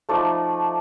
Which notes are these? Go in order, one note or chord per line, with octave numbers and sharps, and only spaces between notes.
F3 A3 D#4 D5